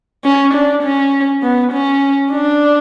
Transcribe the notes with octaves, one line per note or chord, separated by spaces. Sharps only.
C#4
D4
C#4
B3
C#4
D4